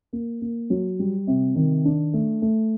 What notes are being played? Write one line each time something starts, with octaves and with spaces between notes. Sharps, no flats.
A#3
A#3
F#3
G3
C3
D#3
D4
A3
A3